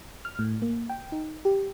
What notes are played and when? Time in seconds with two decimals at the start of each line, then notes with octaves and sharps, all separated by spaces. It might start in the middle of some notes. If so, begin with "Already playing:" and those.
0.25 F6
0.39 A2
0.62 A#3
0.90 G5
1.12 D#4
1.45 G4